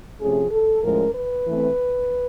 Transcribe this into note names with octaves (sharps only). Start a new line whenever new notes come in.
C3 F3 A3 C#4 G#4
A4
A2 F3 G#3 C#4 A#4
B4
E3 A3 C4